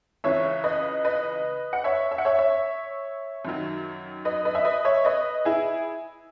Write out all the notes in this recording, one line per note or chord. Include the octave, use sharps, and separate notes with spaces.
C#2 C#3 E3 C#5 E5
B4 D#5
B4 D#5
F#5
C#5 E5
E5
F#5
C#5 E5
C#5 E5
F#2 D#3 F#3
B4 D#5
B4 D#5
E5
B4 D#5
C#5 E5
B4 D#5
E4 G#4